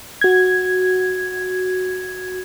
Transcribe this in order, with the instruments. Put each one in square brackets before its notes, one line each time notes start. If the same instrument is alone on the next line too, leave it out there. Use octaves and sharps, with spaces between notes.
[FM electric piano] F#4 G#6